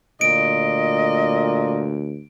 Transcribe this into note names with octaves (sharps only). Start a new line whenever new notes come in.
D2 A#2 D#5 D7